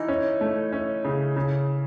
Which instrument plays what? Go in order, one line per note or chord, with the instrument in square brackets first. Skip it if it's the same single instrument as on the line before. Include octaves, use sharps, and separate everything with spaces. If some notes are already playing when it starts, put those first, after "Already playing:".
Already playing: [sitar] E3 [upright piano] D#4
[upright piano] C#4
A3
C#4
C#3
C#3